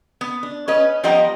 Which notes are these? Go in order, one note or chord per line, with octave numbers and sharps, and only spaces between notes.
B3
D4
C#4 B4 D#5
F3 G3 B3 D#5 G5 A#5